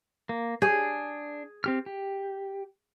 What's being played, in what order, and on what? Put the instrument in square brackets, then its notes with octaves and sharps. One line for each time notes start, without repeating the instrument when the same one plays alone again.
[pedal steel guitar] A#3
[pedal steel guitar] D4 G6 [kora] G#4
[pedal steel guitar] C4 G4 F6
G4